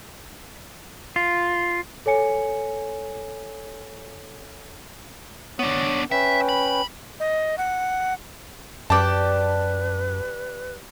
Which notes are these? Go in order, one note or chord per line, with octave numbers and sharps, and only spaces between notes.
F4
A4 C#5 G#5 C#7
B3 D4 C#5
C#4 B4 E5 G5
B5
D#5
F#5
F#2 G4 B4 D5 A5 D6